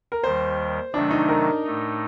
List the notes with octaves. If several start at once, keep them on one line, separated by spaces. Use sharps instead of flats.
A#4
D#2 D#3 G3 C5
C3 D#3 F#3 A3 D4
D#4
A#4
A2 A3 D#4